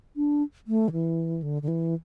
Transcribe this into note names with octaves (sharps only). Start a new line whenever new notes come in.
D4
A3
D3
E3
D3
D3
E3